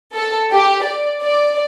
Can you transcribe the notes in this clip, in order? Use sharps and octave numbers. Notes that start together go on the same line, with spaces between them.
A4
G4
D5
D5